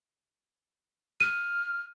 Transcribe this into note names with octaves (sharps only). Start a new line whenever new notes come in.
F6 D#7